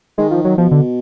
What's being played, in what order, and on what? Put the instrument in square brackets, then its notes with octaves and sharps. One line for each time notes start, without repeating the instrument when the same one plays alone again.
[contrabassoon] D#3 [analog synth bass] G#3
[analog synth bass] F3
F#3
[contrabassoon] B2 [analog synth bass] F3
[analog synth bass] D3